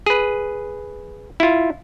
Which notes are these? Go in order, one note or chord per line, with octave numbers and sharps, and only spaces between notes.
G#4 B4
E4 F4